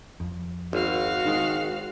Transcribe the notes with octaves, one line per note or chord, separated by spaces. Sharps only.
F2
G#1 F#4 F5
D#3 G#3